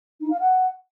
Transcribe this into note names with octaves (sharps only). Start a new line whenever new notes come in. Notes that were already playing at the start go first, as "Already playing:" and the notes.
D#4
F5
F#5